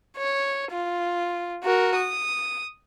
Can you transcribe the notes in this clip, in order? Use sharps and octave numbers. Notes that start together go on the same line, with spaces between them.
C#5
F4
F#4 A#4
D#6